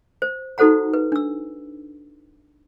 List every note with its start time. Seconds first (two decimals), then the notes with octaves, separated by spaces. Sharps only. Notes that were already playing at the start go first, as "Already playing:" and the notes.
0.22 C5
0.58 D#4 F#4 A4 C5 F#5 A#5
0.94 B4
1.12 D4 E6